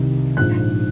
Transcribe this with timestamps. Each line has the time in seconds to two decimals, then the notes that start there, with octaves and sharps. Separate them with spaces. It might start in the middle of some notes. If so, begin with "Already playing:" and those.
Already playing: C2 C3 D#3
0.37 A#1 G#2 F3 F#6